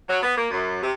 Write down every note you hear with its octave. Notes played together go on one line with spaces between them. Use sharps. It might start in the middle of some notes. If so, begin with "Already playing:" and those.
F#3
B3
A#3
F#2
C3